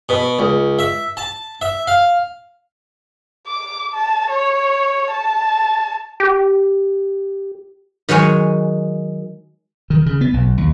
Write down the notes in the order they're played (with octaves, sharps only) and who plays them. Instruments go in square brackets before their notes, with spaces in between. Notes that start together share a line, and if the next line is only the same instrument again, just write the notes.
[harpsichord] B2
C#2
E5
A5
E5
F5
[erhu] D6
A5
C#5
A5
[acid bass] G4
[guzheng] D#3 F#3 G#3 C#5 G#5
[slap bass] D#3
C#3
B3
B1
D#2